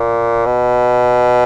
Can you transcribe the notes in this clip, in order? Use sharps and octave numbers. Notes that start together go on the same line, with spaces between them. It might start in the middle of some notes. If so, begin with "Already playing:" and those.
Already playing: A#2
B2